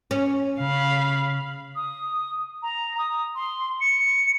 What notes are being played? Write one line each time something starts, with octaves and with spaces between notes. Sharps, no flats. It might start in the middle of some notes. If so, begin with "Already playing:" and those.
C#4
C#3 F5 B5
D#6
A#5
D#6
C6
C#7